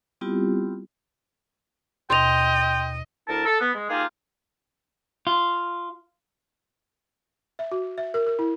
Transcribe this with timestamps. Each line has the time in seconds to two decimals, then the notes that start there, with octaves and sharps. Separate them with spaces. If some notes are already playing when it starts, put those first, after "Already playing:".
0.21 G3 B3 C4 E4 F4 G4
2.10 D#2 B2 D#5 G5 C6 F7
3.28 D2 E4 A#4 A5
3.46 A4
3.60 B3
3.74 G#3
3.89 A#3 D#4 F4 G4 G#4
5.27 F4
7.59 E5
7.72 F#4
7.98 E5
8.14 A#4
8.27 A#4
8.39 E4